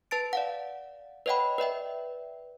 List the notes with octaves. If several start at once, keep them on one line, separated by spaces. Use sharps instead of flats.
B4 A5 A6 D7
D5 F5 F#5
B4 C#5 D#5 F#5 G5 B5
B4 D5 E5 G5